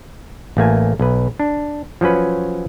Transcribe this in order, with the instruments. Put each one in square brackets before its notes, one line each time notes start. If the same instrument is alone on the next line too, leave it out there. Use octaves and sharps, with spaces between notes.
[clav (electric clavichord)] A1 A3 A#3 G#5
B1 B4
D4
F3 F#3 C#4 B4